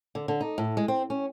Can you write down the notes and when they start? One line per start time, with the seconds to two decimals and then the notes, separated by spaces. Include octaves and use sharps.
0.15 D3
0.28 D3
0.41 D#4
0.58 A2
0.77 G#3
0.88 C4
1.10 C#4